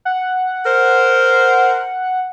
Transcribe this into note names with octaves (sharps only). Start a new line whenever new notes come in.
F#5
A#4 C5